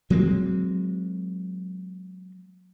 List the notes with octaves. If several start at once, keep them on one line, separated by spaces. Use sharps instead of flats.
F#3 G#3 A#3 C4